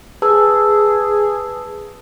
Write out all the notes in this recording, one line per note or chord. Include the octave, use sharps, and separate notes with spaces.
G#4 B4 A5 E6